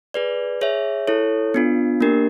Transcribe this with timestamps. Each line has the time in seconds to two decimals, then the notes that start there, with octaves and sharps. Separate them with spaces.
0.14 G#4 B4 D5
0.61 G#4 C#5 E5
1.07 E4 A4 C#5
1.54 B3 D4 F4
2.01 A#3 D4 G4 A#4